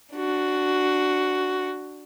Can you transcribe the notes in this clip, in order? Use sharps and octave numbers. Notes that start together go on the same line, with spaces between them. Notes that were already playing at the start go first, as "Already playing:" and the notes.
D4 F#4